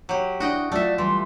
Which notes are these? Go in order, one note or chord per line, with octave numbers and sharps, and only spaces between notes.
F#3 G4
D4 E4 F#4 D#5 G5
F#3 A3 F4 D5 E5
E3 G3 C6